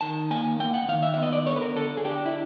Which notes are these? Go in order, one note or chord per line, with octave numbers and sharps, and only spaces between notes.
D#3 A5
A#3 G#5
A#3 G5
F#5
D#3 F5
E5
E5
B3
D#5
D5
D3 C#5
B4
A#4
D3 A4
G#4
D4 G4
E4